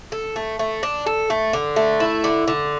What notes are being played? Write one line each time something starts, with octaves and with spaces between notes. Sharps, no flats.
A4
A3
A3
D4
A4
A3
D3
A3
E4
D3
D3